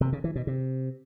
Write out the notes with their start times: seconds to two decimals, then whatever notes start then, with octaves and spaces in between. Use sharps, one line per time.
0.01 C3
0.12 C#3
0.24 E3
0.36 B2
0.47 C3